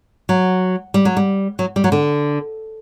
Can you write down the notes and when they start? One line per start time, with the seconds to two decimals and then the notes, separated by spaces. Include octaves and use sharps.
0.29 F#3
0.94 G3
1.05 F#3
1.17 G3
1.59 F#3
1.76 G3
1.84 F#3
1.92 D3